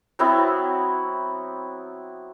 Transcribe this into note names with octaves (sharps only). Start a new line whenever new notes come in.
F#3 B3 C4 E4